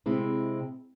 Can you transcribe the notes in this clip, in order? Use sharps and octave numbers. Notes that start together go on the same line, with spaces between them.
C3 G#3 C4 E4